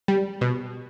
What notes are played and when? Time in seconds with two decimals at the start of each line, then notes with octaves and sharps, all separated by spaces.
0.08 G3
0.41 B2